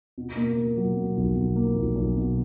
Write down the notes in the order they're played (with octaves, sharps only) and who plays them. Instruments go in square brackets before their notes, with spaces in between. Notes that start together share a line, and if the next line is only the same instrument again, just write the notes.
[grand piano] B2
A#3
A#3
F#3
B2
B1
B1
A#3
B1
B1
B2